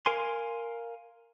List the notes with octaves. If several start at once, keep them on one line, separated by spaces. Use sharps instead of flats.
A#4 F5 G#5 C6